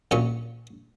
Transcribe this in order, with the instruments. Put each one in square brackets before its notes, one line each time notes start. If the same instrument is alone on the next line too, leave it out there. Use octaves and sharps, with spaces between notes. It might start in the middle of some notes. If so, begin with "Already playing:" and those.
[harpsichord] A#1 A#2 C#4 C#6